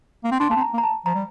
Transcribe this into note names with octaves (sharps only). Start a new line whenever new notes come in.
A#3
C4
D4 C6
A#3 A5
C4
A#5
A#3
A#5
A5
F3 A#5
G3